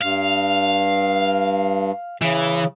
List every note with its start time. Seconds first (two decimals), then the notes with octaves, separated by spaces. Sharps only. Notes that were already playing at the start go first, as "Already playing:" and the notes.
0.02 G2 F5
2.22 C#3 E3